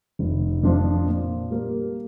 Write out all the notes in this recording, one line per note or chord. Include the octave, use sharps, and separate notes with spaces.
F1
F2 F3 D4 F4
A#2
G3 A#3